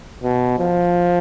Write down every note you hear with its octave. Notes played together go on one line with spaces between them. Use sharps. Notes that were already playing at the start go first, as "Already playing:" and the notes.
B2
F3